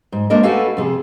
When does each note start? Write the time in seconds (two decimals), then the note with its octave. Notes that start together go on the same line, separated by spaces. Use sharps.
0.12 G#2
0.30 G#3 A#3 D4 A#4 C5 D#5
0.43 A3 F#4 A4 B4 F5 G#5
0.77 F2 C3 G#4